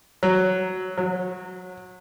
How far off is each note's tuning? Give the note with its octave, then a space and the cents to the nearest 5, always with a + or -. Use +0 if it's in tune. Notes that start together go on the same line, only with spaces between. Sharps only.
F#3 +5
F#3 -25